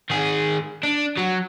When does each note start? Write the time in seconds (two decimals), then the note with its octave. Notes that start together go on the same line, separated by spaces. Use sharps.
0.10 D#3 G#4
0.83 D4
1.17 F#3